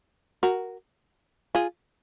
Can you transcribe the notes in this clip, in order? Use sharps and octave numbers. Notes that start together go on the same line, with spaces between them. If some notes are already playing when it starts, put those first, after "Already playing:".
F#4 A#4
F4 G#4